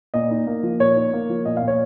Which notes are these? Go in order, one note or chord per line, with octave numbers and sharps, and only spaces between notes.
A#2 D#5
D#4
A#3
F3
A#2 C#5
D#4
A#3
F3
A#2 D#5
F5
A#2
C#5